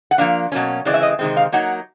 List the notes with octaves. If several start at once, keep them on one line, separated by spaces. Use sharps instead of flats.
F#5
F3 A#3 D4 F5
B2 F#3 A#3 C#4
C#3 E3 G#3 C4 D5
E5
D#5
C3 D#3 G#3 C4
F5
F#3 A#3 D#4 F#5